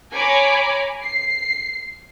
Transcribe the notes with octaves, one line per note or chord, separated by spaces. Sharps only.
C#5 G#5 A#5 B5 D6
C7